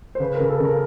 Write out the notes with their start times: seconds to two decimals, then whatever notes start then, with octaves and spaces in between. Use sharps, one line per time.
0.15 C5
0.20 C#3 B4
0.35 A#4
0.40 C#3
0.49 A4
0.60 C#3 A#4